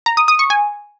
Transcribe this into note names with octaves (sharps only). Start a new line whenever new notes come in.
A#5
D#6
D#6
C#6
G#5